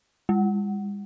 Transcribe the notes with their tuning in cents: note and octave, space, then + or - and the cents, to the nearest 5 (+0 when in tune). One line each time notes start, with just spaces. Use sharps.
G#3 -45